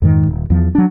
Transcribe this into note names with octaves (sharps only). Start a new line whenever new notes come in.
F2 G#2 D#3
D#1
E2 F3
F#3 D4